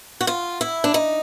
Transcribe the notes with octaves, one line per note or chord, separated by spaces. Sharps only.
F#4
F4
E4
D4
D#4